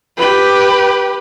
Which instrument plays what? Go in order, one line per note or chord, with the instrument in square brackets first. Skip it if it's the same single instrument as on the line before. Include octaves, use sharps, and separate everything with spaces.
[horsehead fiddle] G4 B4